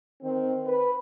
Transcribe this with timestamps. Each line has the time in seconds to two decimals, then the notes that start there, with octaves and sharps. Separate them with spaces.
0.21 D#3 C4
0.66 B4